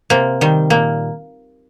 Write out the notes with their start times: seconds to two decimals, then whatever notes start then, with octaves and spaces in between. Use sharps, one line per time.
0.10 C3 A#3
0.41 D#3 G3
0.70 A#2 A#3